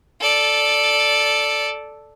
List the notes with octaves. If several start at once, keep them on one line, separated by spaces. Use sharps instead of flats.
A4 D5